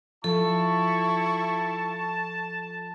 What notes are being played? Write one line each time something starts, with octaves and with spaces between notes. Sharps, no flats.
F3 E4 A4 A5 C#6